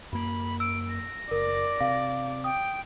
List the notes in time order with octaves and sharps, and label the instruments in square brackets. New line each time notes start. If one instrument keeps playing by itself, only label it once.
[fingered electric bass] F#2 A#3 [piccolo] B5
[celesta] E6 [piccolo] D7
[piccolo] A#6
[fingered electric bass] F#1 [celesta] A#4 [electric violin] D5
[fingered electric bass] C3 [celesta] F5
[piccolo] G5 [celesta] D#6